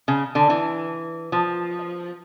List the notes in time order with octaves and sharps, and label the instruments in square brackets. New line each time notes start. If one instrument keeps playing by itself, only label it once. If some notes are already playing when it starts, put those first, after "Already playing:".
[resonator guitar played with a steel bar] C#3
D3
E3
F3